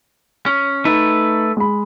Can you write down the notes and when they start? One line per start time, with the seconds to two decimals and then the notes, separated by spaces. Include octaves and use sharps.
0.46 C#4
0.85 A3 D#4 B4
1.57 G#3 B5